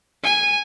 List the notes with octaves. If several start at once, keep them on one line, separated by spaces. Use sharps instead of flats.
G#5